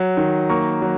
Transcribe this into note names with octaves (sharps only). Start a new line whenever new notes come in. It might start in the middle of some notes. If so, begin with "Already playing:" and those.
Already playing: F#3
D#3
A#3 A#5 C#6
F#3